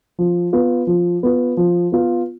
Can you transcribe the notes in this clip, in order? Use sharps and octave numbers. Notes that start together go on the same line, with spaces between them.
F3
B3 F4
F3
B3 F4
F3
B3 F4